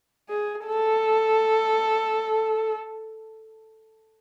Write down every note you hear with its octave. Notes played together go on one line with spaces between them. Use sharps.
G#4
A4